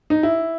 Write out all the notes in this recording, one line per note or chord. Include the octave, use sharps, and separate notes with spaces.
D#4
E4